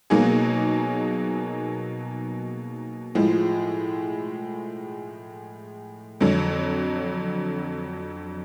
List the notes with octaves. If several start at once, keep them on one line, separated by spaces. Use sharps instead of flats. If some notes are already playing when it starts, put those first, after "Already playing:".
B2 F#3 A#3 D#4 G#4
A2 F3 G#3
F2 D3 F#3